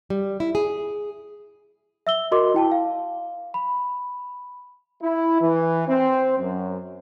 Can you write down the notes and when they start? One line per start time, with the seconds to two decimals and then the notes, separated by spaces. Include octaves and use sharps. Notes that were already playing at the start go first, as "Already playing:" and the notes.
0.10 G3
0.40 E4
0.55 G#4
2.07 E5 E6 G7
2.32 F#4 A#4 D#5 C6 D6
2.54 E4 G5 A5
2.72 F5
3.54 B5
5.03 E4
5.42 E3
5.88 C4
6.38 F#2